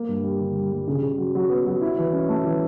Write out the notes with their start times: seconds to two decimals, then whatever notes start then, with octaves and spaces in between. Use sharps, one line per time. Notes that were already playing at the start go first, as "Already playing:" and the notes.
Already playing: A#3
0.09 G2
0.23 G3
0.40 D3
0.56 G3
0.72 G3
0.87 C#3
1.02 C#3
1.18 F#3
1.35 F#3
1.50 B3
1.66 F#3
1.81 E4
1.98 E3
2.13 C#4
2.29 A3
2.44 E3